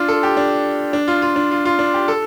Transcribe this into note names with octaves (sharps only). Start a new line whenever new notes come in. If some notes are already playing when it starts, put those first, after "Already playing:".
Already playing: D4 F4
A4
G4
D4
D4
F4
F4
D4
F4
F4
D4
G4
A4